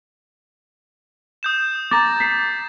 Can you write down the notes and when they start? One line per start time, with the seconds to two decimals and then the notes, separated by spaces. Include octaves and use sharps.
1.43 D#6 G6 E7
1.91 A#5 D6 A6 A#6
2.20 B6 C7